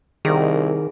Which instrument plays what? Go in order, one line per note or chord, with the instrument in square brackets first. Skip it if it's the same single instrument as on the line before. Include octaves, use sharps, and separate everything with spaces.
[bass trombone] C2 [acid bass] D#3 [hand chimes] G#4